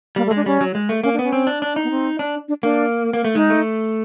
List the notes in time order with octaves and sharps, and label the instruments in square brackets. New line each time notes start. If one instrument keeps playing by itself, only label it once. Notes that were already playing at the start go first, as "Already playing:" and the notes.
[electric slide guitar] G3 [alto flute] A#3
[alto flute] A3
[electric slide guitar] G#3
[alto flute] D4
[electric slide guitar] G3 [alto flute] C#4
[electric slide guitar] F#3
G#3
A3
[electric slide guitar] A#3 [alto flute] C#4
[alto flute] D4
[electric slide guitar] B3 [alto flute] C#4
[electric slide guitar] C4
D4
D4
D#4
[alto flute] B3
C4
[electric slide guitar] D4
[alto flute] D4
[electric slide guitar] A#3 [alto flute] D4
[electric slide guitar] A#3
A3
[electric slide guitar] G#3 [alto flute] D#4
[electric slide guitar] A3